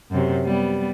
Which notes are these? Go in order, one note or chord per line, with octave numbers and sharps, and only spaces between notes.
F#2 C3
G3 B3